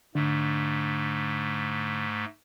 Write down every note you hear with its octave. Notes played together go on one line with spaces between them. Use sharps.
G#2 D3 A3 D4